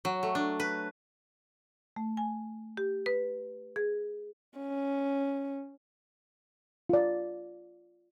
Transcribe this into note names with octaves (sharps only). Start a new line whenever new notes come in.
F#3
A3
D4
B4
A3
G#5
G4
B4
G#4
C#4
F4 D5